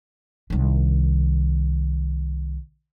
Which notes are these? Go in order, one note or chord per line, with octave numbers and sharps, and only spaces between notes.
C2 D#3